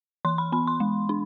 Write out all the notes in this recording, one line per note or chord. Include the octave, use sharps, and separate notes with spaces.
E3 C6
B5
B3 B5
C6
G#3
D4